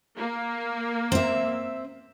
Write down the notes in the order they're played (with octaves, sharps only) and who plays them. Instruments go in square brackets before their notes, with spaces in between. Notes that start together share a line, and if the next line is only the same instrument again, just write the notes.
[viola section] A#3
[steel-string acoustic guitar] C4 E5